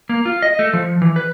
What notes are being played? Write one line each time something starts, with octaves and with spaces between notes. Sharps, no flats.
A#3
F4
D#5
A3
F3
E3
B4